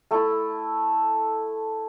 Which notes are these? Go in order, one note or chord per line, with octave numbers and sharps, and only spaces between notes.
A3 E4 A4